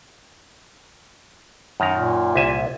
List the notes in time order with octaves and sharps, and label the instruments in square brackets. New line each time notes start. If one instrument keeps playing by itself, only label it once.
[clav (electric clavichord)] F#2 D#3 A#5
[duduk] A#2
[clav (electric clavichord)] C2 E5 G#5